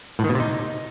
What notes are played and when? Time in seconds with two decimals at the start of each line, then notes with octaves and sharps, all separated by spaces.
0.19 A2
0.24 D#3
0.29 B2
0.35 C3
0.40 D#4